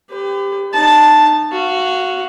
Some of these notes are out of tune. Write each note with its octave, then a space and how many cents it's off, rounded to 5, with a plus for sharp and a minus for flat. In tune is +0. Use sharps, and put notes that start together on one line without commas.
G4 +15 B4 +40
D#4 -30 A5 +0
F#4 +0 F5 -25